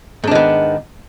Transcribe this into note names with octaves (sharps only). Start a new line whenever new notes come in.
G#2 D#3 B3 D4